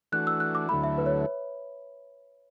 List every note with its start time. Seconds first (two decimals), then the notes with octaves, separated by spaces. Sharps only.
0.12 E3 A3 D4 F#4 F#6
0.27 E6
0.40 F#6
0.55 D6
0.69 D2 D3 F#3 A3 E4 B5
0.83 E5
0.98 B4
1.06 C#5